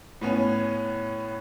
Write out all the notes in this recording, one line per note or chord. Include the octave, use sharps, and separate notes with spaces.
A2 B3 C#4